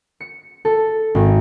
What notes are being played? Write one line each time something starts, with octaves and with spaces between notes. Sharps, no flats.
C#7
A4
G#1